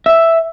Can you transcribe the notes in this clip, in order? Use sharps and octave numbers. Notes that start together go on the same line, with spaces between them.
E5